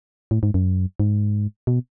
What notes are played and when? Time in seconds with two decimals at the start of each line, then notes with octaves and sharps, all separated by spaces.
0.31 A2
0.43 G#2
0.54 F#2
1.00 G#2
1.67 B2